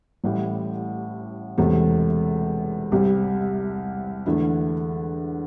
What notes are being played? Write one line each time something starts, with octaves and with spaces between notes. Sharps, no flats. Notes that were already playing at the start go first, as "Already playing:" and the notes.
A1 A2 G3
E1 E2 C3 A3
C2 C3 G3
E2 D3 A3 E4